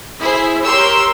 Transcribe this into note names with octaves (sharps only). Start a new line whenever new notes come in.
E4 G#4 C5
G4 A#4 C#5 C6 E6